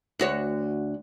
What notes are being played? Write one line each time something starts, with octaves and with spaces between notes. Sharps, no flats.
D2 F#4 C#5